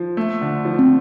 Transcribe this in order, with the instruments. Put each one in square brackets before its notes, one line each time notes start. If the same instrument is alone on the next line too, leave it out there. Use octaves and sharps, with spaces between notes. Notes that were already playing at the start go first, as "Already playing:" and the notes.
Already playing: [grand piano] F3
A3
D3
F3
[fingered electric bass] C4